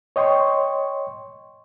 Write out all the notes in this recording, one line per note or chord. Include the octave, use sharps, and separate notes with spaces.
C#5 D#5 G5 C6 C#6